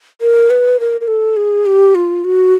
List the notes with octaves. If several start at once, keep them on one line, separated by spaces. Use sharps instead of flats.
A#4
B4
A#4
A#4
A4
G#4
G4
F4
F#4